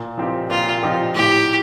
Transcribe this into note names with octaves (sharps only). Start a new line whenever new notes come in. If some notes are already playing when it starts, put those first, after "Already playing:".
Already playing: A#2
F3 C4 D#4 G4
A#2 F4
F3 C4 D#4 G4
A2 G4